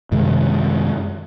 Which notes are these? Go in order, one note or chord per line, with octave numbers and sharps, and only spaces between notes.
F#2 C3 D#3 G#3